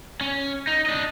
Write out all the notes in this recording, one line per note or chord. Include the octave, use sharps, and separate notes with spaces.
C#4
D#4
D4 D#5